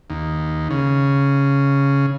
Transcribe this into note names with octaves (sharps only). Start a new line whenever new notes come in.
D#2
C#3